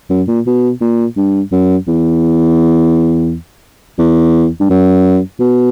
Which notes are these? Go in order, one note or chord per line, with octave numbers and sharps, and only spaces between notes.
F#2
A#2
B2
A#2
G2
F#2
E2
E2
G2
F#2
B2